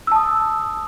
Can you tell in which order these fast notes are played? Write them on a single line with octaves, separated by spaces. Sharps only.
E6 A5 D#6